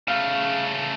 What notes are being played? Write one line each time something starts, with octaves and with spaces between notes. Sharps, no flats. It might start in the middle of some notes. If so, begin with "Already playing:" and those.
C#3 A3 F5